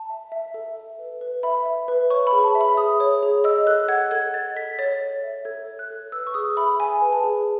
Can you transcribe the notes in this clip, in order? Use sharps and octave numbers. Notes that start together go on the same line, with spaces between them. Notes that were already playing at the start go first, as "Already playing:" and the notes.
Already playing: A5
E5
E5
A4
E5
B4
B4
E5 B5
E5
B4
C#5 C#6
B5
G#4
A5
E5
B5
G#4 D#6
C#5
G#4
D#5 E6
A4 F#6
F#5 G#6
A4 G#6
D#5 A6
A4 B6
C#5 A6
A4
E5
A4 G#6
C#5
F#6
A4
B4 E6
C#6
G#4 D#6
E5 B5
G#4 G#5
B4
A5
G#4